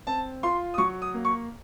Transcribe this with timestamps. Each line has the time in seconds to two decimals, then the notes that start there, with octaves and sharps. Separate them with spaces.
0.07 C4 A5
0.43 F4 C6
0.74 D#6
0.78 F#3 C#6
1.02 D#6
1.14 A#3
1.25 C#6